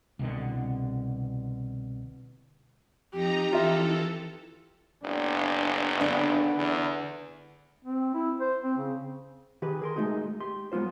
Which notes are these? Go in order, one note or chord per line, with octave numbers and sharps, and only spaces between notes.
C2 B2 D3
F2 D#4 G4 A#5
E3 F4 A4 E5
F#1 B3 D4
D3 B3 D4
E2
C4
E4
C5
C4
C#3
D#3 G4 G#4 B4
G#4 A#4 C6
G#3 A3 D#4 F#4 G#4
G4 C6
F#3 G#3 B3 F4 C5